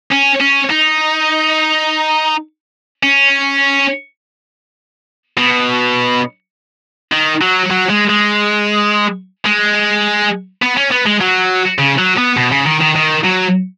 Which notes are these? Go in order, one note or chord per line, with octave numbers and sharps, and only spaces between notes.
C#4
C#4
D#4
C#4
B2
D#3
F#3
F#3
G#3
G#3
G#3
B3
C#4
B3
G#3
F#3
C#3
F#3
B3
B2
C#3
D#3
D#3
D#3
F#3